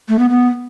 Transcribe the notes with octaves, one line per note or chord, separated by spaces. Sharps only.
A3
B3
B3